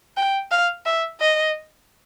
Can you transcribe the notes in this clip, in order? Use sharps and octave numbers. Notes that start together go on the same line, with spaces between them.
G5
F5
E5
D#5